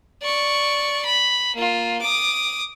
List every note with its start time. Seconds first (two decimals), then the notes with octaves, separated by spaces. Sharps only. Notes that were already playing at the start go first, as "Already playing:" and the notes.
0.22 D5 C#6
1.05 B5
1.55 A#3 F4
2.01 D6 D#6